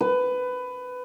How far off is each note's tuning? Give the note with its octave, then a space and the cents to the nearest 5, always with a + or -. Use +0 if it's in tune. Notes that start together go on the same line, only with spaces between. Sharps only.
B4 +20